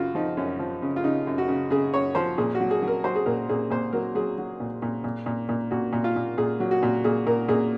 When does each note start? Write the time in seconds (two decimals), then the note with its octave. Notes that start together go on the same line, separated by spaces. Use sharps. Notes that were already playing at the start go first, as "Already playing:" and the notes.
Already playing: F#2 C#3 F4 F#4
0.15 F3 D#4
0.37 F#2 C#4
0.59 F3
0.82 C#3
0.96 F4
1.04 C#3 D#4
1.27 F#2
1.38 F#4
1.48 C#3
1.70 C#3 G#4
1.93 F#2 C#5
2.15 F3 C5
2.38 A#2 G#4
2.55 F#4
2.60 F#3
2.71 G#4
2.82 F#3
2.88 A#4
3.04 F#3 C5
3.16 G#4
3.26 A#2 A#4
3.49 A#2 G#4
3.70 A#2 C5
3.93 F#3 A#4
4.15 F#3 G#4
4.38 F#3
4.60 A#2
4.82 A#2
5.04 A#2
5.26 A#2
5.49 A#2
5.71 A#2 F#4
5.93 A#2
6.04 F4
6.16 A#2
6.38 A#2 G#4
6.60 F#3
6.71 F#4
6.83 A#2
7.04 A#2 G#4
7.26 A#2 A#4
7.48 A#2 G#4